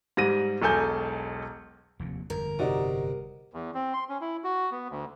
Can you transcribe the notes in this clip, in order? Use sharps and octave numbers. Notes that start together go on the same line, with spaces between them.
G#2 G3 A#6 D#7
E1 B1 A4 G#5 G6
F1 D#2
G1 F2 A#4
C3 D#4 F#4 D5
E2
C4
C6
C#4
E4
F#4
B3
D2